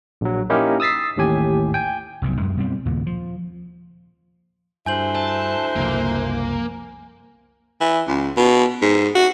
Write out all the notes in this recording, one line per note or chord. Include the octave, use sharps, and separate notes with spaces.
A#1 F#3
A#3 C#4 D#4 E4 G4 A#4
D#6 E6 A6 B6 C7
A1 D#2 A2 G4 G#5
G5 G#5
F1 B1 C3
F#2 G#3
B2 G3 C4
D#2 A#2 C#3
F3
D2 G2 E4 C5 G#5 G6 F#7
G#5 A5
F#1 C2 F3 A#3
E3
C#2
B2
G#2
F#4